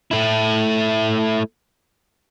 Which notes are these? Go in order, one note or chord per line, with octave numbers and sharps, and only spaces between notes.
A3 E4